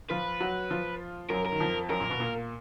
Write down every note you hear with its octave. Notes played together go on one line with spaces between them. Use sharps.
F3 F4 B4
F#3 F#4
F3 F4
F#2 F#3 A#4
A#4
D#3
F2 F3
F#2 F#3 A#4
A#2 A#3
B2 B3
A#2 A#3